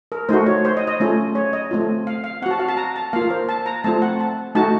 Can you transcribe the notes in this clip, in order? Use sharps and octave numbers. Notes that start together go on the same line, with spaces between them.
A#4
A3 D#4 F#4 C5
C#5
C5
D#5
D#5
A3 C#4 F4
C#5
D#5
A3 C4 F4
F5
F5
C4 F#4 F#5 A5
F5
A5
A#5
A5
A#3 F4 F5
A#4
C5
A5
A#5
A3 C4 F4 A5
F#5
A5
A3 D#4 F#4 A5